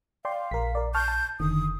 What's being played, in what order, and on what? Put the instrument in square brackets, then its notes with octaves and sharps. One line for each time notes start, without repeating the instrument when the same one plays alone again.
[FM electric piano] D5 G5 C6 [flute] F5
[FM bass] A#1 [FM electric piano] A#4 B6
[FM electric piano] A#4 D5
[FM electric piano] A5 C#6 F6 [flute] G6
[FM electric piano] A5
[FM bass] F1 [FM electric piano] D3 D#3 [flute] D#6